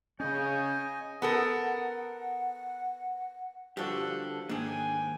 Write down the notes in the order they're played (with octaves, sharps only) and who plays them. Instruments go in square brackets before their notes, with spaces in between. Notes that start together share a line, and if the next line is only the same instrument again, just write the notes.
[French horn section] C#3 [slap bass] C#4 [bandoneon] D#5 G#5 [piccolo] G6
[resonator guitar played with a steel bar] B3 A4 A#4 [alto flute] F#5
[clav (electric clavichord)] G2 F3 F#4 [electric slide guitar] D3 G4 [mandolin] D4 A4
[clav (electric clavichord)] G#2 [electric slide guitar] D#3 A#3 [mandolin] D4 G#4 [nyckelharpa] G5 G#5